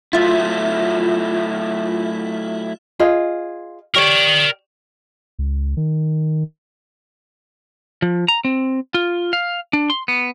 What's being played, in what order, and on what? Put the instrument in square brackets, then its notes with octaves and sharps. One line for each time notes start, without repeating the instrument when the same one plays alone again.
[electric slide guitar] F#3 A3 E4 [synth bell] F4 E5
[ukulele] F4 G#4 D#5
[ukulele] G4 C#5 D5 [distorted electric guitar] A#4 G5
[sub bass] C#2
D#3
[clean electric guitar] F3
A#5
C4
F4
F5
D4
C6
B3